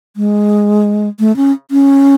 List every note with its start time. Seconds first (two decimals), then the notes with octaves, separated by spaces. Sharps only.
0.16 G#3
1.19 A3
1.36 C#4
1.71 C#4